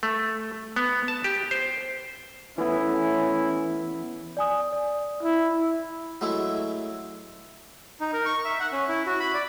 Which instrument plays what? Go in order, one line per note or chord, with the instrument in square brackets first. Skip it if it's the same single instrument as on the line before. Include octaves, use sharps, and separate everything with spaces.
[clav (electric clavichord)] A3
B3
A5
G4
C5
[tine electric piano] E3 B3 [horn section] A3 C#4 E4
[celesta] D5 G#5 D#6
D5
[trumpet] E4
[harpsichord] F#3 G#3 A3 E4
[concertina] D#4
A#4
C#6
E5
F#5
C#4
E4
F#4
B5
D5